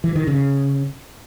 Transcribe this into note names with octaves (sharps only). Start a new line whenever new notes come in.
E3
D#3
C#3